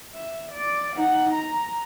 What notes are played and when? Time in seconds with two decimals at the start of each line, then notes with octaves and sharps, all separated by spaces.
0.15 E5
0.53 D5
0.96 D#4 F#5
1.34 A#5